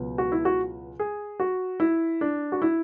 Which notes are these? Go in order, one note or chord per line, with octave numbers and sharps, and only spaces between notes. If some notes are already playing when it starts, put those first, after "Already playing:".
Already playing: C#2 B2 F#3 B3
F#4
E4
F#4
G#4
F#4
E4
D4
F#4
E4